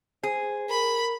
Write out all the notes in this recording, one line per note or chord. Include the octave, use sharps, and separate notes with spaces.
G#4 C5
A#4 B5